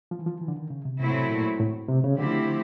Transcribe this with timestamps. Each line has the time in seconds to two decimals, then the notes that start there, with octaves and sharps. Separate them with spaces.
0.11 F3
0.19 E3
0.26 F3
0.41 E3
0.48 D3
0.56 D#3
0.70 C#3
0.85 C3
1.00 A2 C3 F#3 A3 C4 E4
1.30 A#2
1.60 A2
1.88 C3
2.04 C#3
2.18 D3 F3 A3 C4 E4 G4